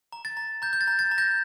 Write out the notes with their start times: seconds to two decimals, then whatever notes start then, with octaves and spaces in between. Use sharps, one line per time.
0.12 A#5
0.25 A6
0.37 A#5
0.62 A#5 G6
0.73 G6
0.81 A6
0.88 A#5
0.99 A6
1.11 A#5
1.18 G6 A#6